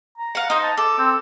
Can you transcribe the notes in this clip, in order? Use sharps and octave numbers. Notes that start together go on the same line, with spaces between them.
A#5
F5 F#5
D#4 C5 D#5
A5
A4 D6
C4